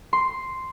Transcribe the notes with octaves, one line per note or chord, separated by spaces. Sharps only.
C6